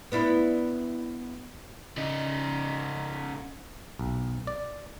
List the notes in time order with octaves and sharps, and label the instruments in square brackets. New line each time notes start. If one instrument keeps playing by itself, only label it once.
[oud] B3 D4 E4
[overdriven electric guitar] C#3 D#4
[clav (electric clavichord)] B1
D5